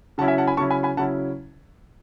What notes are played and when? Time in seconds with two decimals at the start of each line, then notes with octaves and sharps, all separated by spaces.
0.18 C#3 F#3 C#4 E4 F#5 A5
0.28 E5 G#5
0.38 F#5 A5
0.47 G#5 B5
0.57 C#3 F#3 C#4 E4 A5 C#6
0.70 G#5 B5
0.83 G#5 B5
0.97 C#3 F#3 C#4 E4 F#5 A5